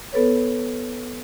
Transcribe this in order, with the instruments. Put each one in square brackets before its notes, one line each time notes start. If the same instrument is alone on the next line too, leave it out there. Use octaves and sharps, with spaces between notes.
[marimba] B3 A4 B4 C#5